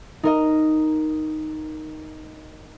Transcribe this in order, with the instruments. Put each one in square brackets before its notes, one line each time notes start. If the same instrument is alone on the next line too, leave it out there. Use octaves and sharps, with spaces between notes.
[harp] D#4 A#4 D#5